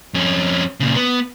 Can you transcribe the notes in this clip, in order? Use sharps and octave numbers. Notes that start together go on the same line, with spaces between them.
F2 C#4
A#2 C#3
B3